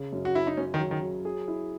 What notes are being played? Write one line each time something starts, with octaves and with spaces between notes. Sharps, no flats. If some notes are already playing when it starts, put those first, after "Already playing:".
Already playing: C#3
F#2
F#4
F#3 E4
D#4
F#2 C#4
D#3
F#3
D#3
F#3
G#4
E4